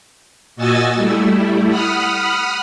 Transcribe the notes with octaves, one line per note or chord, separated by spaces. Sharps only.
A#2 F#4 D#5 G#5 E6 A6
G3 A3 E4
F#5 B5 D#6 F6